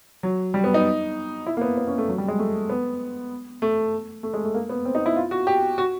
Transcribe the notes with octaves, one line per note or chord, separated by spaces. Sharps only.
F#3
G3
B3
D#4
E4
A#3
B3
B3
C#4
A3
F#3
G3
G#3
A3
B3
A3
A3
G#3
A3
A#3
B3
C4
D#4
E4
F4
F#4
G4
F#4